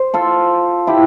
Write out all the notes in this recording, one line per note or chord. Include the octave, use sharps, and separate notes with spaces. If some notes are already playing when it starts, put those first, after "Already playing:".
Already playing: C5
F4 A4
E4 G4